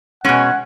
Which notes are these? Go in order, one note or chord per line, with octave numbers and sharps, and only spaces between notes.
B2 G#3 C#4 F#5